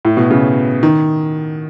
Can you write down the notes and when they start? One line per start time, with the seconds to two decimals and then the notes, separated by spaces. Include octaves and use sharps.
0.05 A2
0.17 B2
0.31 C#3
0.83 D#3